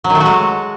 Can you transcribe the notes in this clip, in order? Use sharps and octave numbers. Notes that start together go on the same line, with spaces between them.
F#3
D#3
A3
F#4
G#3